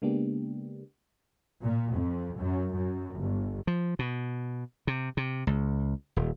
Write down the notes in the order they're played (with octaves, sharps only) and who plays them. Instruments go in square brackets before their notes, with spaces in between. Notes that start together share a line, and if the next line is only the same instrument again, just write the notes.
[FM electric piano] C#3 G#3 A#3 B3 D4 G4
[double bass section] A#2
F2
F#2
F#2
G1
[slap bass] F3
B2
C3
C3
C#2
D#1